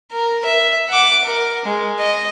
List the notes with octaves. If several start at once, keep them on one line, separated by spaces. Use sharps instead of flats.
A#4
E5
F#5 D6
A#4
G#3
D#5